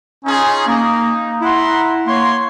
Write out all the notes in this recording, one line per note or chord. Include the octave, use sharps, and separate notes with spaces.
C#4 D#4 F4 G#4
A#3 D#4
E4 F#5 A#5 C6
A#3 C#5 C6